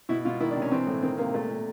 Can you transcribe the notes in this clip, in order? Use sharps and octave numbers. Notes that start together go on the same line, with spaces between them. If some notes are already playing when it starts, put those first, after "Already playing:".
B2 E4
B2 F4
D#3 E4
D4
C3
C#4
E3 C4
A2
D#3 C4
C3 A#3
A#2 A3
A#2